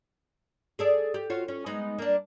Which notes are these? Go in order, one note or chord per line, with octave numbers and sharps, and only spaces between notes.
G#4 A4 D5
G4
F4 F#4 C#5
C#4
G#3 B3 D#4
A#3 D4